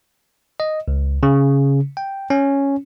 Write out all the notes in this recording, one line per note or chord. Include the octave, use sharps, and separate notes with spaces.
D#5
C#2
C#3
G5
C#4